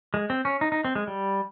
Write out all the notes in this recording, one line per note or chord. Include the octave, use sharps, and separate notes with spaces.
G#3
C4
C#4
D#4
D#4
C4
G#3
G3